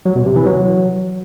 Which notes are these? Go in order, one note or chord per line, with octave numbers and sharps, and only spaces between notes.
F#3
B2
C3
E3
F#3